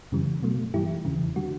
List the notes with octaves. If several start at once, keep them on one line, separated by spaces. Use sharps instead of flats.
F#2 C#3 E3 G3
B2 F#3 A3
G2 E3 G3 E4 G4
E2 C#3 E3
D3 G3 F#4